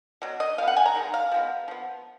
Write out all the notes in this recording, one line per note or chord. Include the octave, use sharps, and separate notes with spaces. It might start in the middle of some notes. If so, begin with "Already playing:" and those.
B2 F#3
D#5
F3 B3 F5
F#5
G#5
A#5
D#3 G#3 B3
F5
F3 G#3 B3
F3 B3